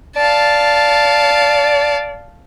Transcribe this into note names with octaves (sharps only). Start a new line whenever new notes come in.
D5 F5 A5